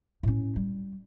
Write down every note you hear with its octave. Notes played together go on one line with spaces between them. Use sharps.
A2 C#4
G3